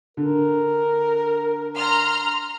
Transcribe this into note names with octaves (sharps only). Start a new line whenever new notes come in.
D3 A#4
A#5 C6 F6